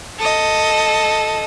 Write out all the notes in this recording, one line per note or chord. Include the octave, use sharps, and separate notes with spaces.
A4 D#5